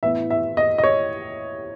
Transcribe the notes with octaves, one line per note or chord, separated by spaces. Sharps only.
A2 E3 B3 E5
E5
D#5
D#5
C#5